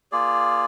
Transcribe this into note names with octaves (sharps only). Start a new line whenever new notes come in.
A#3 F4 G#4 D5